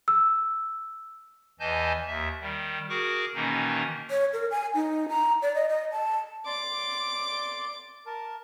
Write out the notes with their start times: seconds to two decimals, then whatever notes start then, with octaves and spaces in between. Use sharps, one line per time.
0.08 E6
1.60 E2 E3 D#5 G#5 A5 G6
2.07 D#2 E5
2.41 D#3 G3
2.89 F#4 G#4 A#4 C#6 D6
3.34 B2 D#3 E3 A#3 C#4 D#4
4.10 C#5
4.33 A#4
4.51 G#5
4.75 D#4
5.09 A#5
5.42 D5
5.55 D#5
5.69 D#5
5.92 A5
6.46 D5 C6 D6
8.07 A#4 A5